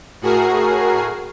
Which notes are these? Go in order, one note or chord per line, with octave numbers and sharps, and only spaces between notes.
A2 F#4 G#4 A#4 C7